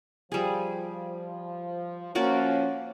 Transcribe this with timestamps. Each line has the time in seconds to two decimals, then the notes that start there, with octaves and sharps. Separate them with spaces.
0.32 F3 G3 G#4
2.15 F3 A#3 C#4 F#4 D5